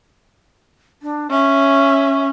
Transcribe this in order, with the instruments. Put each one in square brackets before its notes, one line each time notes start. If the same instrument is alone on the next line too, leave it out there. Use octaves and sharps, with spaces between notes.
[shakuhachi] D4
[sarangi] C#4 [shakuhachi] E5